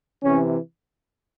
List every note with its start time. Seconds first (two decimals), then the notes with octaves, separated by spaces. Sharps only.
0.24 C3 E3 C#4